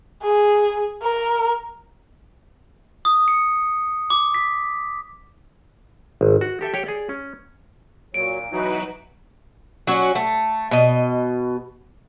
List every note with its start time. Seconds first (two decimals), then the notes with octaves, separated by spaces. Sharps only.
0.23 G#4
1.03 A#4
3.05 D#6
3.28 C#7
4.10 D6
4.34 B6
6.21 G#1
6.41 F#4
6.61 G4 A4 E5 G5
6.74 G4 C#5 G5
6.86 G#4 D5
7.09 C#4
8.14 A#2 F#3 D7
8.52 B2 E3 F#3 D#4 F#4 B4
9.87 F#3 C#4 F#4
10.15 A3
10.71 B2 D#5